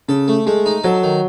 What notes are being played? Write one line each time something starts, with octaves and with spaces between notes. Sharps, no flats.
C#3 A4
A3
G#3 A3
D#4
F#3 A4
D#3